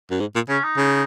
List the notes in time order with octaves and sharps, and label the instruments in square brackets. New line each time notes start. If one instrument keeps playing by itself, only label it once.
[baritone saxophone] F#2
G#2
A#2
[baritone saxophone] C#3 [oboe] C#4
[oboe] D#4
[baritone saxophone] C#3